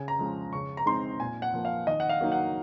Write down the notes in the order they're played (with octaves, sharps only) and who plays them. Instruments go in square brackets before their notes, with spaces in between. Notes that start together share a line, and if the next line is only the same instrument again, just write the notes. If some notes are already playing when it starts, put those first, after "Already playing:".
Already playing: [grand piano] C#3 G#5
A#5
F3 G#3 C#4
C#3 C#6
A#5
G#3 C4 D#4 C6
A#2 G#5
F#5
F3 A#3
F5
D#3 D#5
F#5
F5
F#3 A#3 D#4
F#5